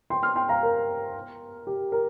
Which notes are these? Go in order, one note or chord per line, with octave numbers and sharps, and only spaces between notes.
G5 C6
C6 F6
G5 C6
F5 A#5
A#4
G4
A#4